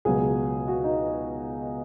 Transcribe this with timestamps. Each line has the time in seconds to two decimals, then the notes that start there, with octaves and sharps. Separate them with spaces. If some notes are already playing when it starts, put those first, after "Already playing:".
0.05 C#2 B2 F#3 G#4
0.68 F#4
0.84 D#4